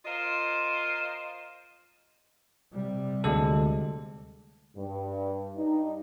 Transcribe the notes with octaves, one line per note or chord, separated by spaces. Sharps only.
F4 A#4 C5 D#5 F5
C3 G3
D2 G#3 A4
G2
G2 D#4